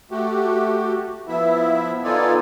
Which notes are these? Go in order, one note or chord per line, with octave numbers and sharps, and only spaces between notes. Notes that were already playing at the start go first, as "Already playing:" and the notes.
A3 F#4 G4
F3 B3 E4 E5
B3 D#4 F4 A4 D5 G#5